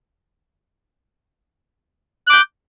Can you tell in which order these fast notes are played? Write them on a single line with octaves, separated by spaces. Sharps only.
F#6 D6 G6